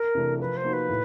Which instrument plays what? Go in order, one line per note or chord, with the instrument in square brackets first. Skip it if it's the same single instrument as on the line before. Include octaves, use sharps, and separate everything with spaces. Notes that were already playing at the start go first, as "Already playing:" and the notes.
Already playing: [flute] A#4
[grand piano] C3 E3 A3 D4
[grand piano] F3 [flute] B4
[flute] C5
[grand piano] A#3 D#4 F#4
[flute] B4
[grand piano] A2